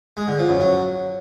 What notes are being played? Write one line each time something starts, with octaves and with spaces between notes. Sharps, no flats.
G#3
D3
F3
F#2
F#3